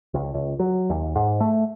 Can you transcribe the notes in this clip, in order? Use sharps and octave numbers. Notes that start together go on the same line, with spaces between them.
C#2
C#2
F#3
D#2
G#2
A3